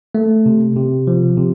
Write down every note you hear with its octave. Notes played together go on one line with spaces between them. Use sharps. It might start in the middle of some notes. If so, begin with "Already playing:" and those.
A3
C3
C3
F3
C3